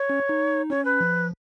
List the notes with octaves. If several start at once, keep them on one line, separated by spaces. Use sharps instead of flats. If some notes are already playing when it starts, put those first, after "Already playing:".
Already playing: C#5
C#4
D#4
C#4 C#5
B4
F3